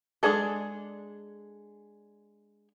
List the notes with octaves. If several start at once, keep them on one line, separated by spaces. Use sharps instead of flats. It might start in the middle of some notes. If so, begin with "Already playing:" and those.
G#3 C#4 D4 G#4 A4